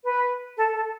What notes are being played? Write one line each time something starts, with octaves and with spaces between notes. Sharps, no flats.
B4
A4
A4